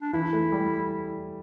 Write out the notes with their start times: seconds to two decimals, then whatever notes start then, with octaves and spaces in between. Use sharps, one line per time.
0.02 D4
0.13 E3 E4
0.33 A3
0.52 G3